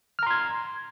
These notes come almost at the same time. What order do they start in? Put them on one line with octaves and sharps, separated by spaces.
F6 A#5 C6 G#6